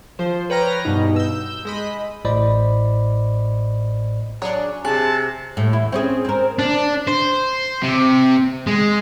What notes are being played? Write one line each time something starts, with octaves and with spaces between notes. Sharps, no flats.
F3 C5
B4 C#5 G5 A#5 F6 A#6
G2 B2 D#4
E6 G6
G#3 D#5 B5
A1 A2 C5 D5 D#5 B5
F#3 D4 G#4 C#5
C3 G#4 A5 F#6
A2
E2 E4
C4 C#4 G#4
C4 A#4
D4
C5
C3
G#3